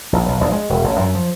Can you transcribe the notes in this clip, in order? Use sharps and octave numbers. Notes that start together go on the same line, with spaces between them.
A#1
B1
A#1
G#3
E1
A1
F#2
F3